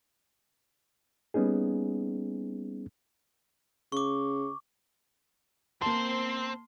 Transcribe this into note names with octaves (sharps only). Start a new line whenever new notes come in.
G3 A#3 B3 C#4 D#4 G#4
C#3 C#6 D6
A#3 C4 A5 C6